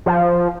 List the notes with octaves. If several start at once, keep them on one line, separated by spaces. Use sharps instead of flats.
F3